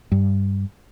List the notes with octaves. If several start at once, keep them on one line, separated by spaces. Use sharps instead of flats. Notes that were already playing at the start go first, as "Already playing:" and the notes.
G2